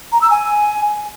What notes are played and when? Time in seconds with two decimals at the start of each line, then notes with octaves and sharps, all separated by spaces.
0.12 A#5
0.22 E6
0.31 G#5